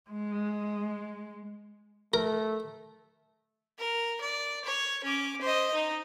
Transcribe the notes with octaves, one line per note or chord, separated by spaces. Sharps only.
G#3
A3 A#4
A#4
D5
C#5
C#4 D6
C5 D#5
D#4